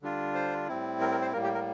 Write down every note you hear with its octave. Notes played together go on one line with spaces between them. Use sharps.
D3 G3 D4 F4
C5
A2 G3 C4 E4
A#4
A#4
C5
A2 G3 A#3 A#4
G4
A#4